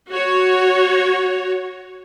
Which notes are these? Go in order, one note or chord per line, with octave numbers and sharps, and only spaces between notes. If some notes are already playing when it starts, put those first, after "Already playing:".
F#4 C#5